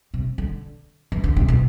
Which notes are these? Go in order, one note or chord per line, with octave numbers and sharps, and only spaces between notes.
C3
D3
E3
D3
C3
B2